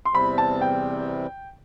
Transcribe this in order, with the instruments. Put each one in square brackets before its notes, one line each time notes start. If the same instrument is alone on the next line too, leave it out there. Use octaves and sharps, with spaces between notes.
[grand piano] C6
[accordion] E2 C3 G3 C4 [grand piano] B5
[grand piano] A5
G5